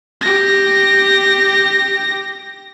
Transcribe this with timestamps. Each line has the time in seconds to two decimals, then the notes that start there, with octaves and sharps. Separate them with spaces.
0.22 G4 A#6